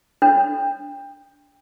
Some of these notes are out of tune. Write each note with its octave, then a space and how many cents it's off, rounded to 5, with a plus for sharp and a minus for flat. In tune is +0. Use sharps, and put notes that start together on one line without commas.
D4 -20